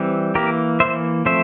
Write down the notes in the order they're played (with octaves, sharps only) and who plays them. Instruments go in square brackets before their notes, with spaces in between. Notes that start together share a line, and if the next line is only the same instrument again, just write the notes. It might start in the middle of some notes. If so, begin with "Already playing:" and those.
Already playing: [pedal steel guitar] E3 G3 C4
E3 A#3 G4 A#4
E3 A#3 C5 E5
F3 A3 C4 C5 E5